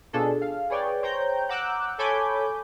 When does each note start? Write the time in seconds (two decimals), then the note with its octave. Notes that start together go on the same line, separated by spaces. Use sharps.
0.13 B2 D4 F4 G#4 A4
0.41 F5
0.70 G#4 B4 C#5 D5 G5
1.02 C5 C#5 G5 A#5 G6
1.49 F#5 A#5 D6 E6 F#6 G6
1.98 A4 C#5 G#5 B5 D6 G6